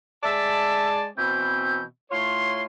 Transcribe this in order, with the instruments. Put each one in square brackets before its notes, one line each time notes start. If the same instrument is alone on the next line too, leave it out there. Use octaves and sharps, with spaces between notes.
[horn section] G#3 D5 A5 [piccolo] E5
[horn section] B2 E3 C4 [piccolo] G6
[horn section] A2 F4 C#5 [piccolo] C6